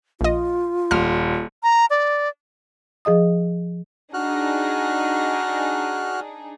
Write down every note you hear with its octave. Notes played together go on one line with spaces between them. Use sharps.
A#1 F4 D#5
D#1 F6
A#5
D5
F3 G#4 D#5 D#6
D4 D#4 F#4 G#4 F6 F#6